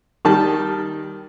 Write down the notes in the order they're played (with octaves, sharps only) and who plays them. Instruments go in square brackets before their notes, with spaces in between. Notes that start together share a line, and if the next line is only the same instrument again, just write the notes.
[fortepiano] D#3 G3 A5